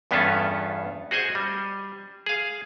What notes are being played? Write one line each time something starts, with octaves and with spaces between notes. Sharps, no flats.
E2 G2 B3 C#4 F4 A4
F#4 G#4 C5 D#5 G#5
G3
G#4 F5